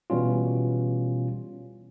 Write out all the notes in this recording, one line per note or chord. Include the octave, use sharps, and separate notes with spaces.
B2 E3 G3 C#4 F4